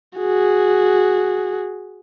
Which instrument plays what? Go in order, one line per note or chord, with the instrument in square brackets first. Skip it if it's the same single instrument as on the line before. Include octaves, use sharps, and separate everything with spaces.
[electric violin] F#4 G#4